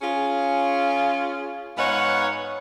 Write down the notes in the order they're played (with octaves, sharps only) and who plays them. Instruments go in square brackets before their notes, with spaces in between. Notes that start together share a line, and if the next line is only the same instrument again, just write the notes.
[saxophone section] C#4 F4 G#4
G#2 B3 D#4 C#5 F5 F#5